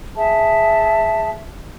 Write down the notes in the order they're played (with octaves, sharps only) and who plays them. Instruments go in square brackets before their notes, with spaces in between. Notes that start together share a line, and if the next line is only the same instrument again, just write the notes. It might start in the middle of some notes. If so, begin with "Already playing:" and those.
[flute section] G#4 E5 A5